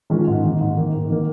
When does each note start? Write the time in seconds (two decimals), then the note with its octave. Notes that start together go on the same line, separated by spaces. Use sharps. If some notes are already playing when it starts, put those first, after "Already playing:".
0.10 D#3 G#3 C#4 F4
0.27 G#2
0.44 D#3 A#3
0.61 G#2
0.77 D#3 A#3
0.94 G#2
1.10 D#3 A#3